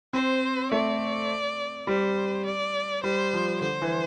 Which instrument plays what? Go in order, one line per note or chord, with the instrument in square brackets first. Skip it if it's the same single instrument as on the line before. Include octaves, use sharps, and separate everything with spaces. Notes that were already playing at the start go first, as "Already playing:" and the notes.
[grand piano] C4 [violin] C5
[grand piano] A3 [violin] D5
[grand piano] G3 [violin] C5
[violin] D5
[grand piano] G3 [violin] C5
[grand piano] F3
[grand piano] D3 [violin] C5
[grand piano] E3